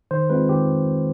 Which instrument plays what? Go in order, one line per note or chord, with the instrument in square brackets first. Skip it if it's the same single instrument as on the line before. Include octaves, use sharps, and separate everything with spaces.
[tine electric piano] D#3 C5
G#3 C4 F4 B4
D#3 G4